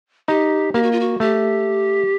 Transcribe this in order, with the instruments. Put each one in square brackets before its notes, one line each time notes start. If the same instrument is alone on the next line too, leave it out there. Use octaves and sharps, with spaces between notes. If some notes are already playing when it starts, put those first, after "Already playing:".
[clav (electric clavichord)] D#4 [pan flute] G4
[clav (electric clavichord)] A#3 [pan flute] G4
[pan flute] F#4
F4
F#4
[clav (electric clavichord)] A3 [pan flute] G4